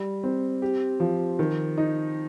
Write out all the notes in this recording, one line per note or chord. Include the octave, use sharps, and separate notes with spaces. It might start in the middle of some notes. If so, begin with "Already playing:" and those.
Already playing: G3
C4
G4
F3
D#3
D#4